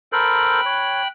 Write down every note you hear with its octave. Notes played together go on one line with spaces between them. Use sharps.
A4 A#4 C5 G5 B5 F#6
C#5